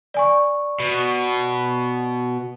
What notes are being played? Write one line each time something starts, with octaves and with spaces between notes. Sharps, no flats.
D5 G#5 C#6
B2